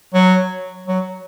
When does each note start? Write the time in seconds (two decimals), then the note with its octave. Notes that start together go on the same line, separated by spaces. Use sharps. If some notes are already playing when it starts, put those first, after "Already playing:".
0.14 F#3
0.88 F#3